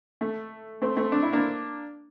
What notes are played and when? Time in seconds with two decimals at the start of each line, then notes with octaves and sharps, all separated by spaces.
0.21 A3
0.82 A3 C4
0.96 A3 C4
1.12 D4
1.23 E4
1.33 A#3 D4